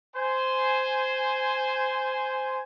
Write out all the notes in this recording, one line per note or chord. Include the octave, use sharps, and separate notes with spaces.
C5 G#5